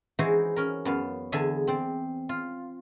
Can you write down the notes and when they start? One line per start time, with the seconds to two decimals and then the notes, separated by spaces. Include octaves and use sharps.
0.19 E3 D#4 E4 F#4 G#4 C5
0.56 C#4 A#4
0.85 F#2 B3 F5
1.32 E2 D3 G#4 E5 G#5 A5
1.67 C4 C5 D5
2.29 F4